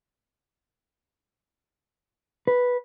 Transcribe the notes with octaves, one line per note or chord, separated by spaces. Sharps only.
B4